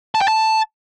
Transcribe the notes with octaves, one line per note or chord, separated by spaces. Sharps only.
A5
G5
A5